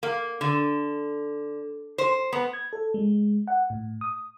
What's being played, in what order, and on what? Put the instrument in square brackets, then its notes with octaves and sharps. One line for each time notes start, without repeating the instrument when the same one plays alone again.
[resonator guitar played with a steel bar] A#3
D3
C5
B3
[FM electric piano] G#6
A4
G#3
F#5
A2
D#6